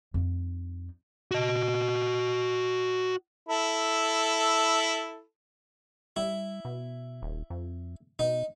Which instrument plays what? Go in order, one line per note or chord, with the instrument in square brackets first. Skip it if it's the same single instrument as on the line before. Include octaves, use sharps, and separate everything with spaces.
[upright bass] F2 D#4
[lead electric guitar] F#4 D#5
[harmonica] E4 A4
[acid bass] G3 [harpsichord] E4
[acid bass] B2
D#1
F2
[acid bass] B2 [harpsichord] D#4